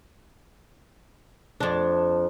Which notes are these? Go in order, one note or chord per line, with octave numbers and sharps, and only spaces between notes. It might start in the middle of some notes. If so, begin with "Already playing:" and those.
F2 D4